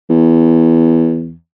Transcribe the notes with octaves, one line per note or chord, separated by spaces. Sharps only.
E2